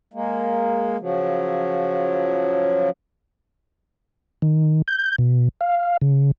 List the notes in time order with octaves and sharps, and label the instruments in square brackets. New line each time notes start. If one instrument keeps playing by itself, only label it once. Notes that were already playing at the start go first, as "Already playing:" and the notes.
[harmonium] G#3 A#3
C#3 F3 F#3
[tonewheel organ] D#3
G6
B2
F5
C#3